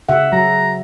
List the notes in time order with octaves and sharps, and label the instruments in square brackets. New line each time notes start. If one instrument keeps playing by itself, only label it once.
[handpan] C#3 E5 F#5
[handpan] F#3 [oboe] A#5